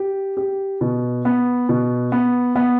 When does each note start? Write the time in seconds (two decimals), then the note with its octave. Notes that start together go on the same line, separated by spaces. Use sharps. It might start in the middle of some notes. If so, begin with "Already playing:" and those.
Already playing: G4
0.37 G4
0.81 B2
1.25 B3
1.69 B2
2.12 B3
2.56 B3